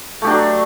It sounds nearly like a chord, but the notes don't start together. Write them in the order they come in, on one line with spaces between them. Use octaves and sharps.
A3 G4 D4 F#3